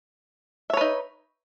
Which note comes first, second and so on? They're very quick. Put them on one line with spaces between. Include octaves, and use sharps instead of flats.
E5 C#5 B4 D#4